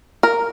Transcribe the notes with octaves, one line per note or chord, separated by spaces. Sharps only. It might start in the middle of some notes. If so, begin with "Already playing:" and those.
A#4